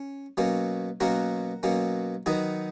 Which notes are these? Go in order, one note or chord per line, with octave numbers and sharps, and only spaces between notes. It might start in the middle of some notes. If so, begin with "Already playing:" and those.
Already playing: C#4
B2 F#3 A#3 C#4
B2 F#3 A#3 C#4 F#4 A#4
B2 F#3 A#3 C#4
D#3 F#3 B3 D#4 F#4